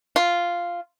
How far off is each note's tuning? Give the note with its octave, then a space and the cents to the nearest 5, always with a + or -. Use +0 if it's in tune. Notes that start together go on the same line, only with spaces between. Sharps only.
F4 -5